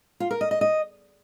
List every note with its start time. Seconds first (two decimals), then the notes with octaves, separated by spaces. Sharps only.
0.20 F4
0.31 A#4
0.41 D#5
0.51 D#5
0.61 D#5